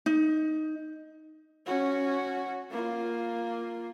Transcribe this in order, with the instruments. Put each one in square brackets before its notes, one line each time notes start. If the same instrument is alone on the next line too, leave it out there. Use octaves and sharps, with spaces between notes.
[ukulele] D#4
[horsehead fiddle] C#4 F#4
A#3 F4